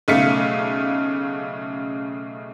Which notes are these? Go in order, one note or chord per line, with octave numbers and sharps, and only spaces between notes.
B1 C#3 A3 F5 B6 C#7